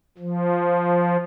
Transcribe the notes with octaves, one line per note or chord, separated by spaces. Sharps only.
F3